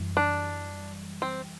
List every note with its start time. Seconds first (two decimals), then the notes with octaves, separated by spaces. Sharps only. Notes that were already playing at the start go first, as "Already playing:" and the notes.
Already playing: F#2 E3 G3
0.17 D4
1.22 C4